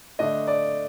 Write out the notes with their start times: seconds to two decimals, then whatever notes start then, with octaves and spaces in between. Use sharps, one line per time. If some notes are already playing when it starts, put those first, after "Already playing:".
0.19 D3 A3 D4 D#5
0.47 D5